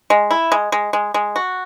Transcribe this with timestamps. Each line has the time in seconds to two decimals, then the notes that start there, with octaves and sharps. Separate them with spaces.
0.10 G#3
0.31 E4
0.52 G#3
0.72 G#3
0.93 G#3
1.14 G#3
1.36 F#4